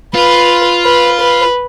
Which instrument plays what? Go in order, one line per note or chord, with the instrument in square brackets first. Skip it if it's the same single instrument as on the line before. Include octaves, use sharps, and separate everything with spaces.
[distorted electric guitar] F4 [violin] B4
[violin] B4
B4